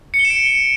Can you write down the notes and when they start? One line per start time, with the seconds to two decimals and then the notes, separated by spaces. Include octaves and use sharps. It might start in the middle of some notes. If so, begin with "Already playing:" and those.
0.14 C#7
0.19 G7
0.25 E7
0.30 D7